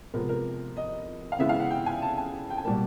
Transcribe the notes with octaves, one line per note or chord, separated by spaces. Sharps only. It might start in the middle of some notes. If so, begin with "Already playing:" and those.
C3 F3 G#3 B3 A#4
A#4
D#5
F5
C#3 E3 G#3 B3 E5
F5
F#5
G5
G#5
A5
G#5
G5
G#5
B2 G3 A#3 A5